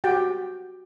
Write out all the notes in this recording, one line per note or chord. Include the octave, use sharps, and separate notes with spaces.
F#4 G4 G5